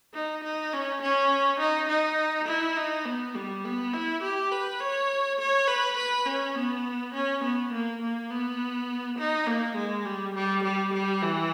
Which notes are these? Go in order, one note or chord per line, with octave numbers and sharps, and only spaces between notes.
D#4
D#4
C#4
C#4
D#4
D#4
E4
D#4
B3
G3
B3
E4
G4
B4
C#5
C#5
B4
B4
C#4
B3
C#4
B3
A#3
A#3
B3
D#4
A#3
G#3
G3
G3
G3
G3
E3